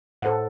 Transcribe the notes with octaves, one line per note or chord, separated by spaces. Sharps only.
A2 A4 C5 F#5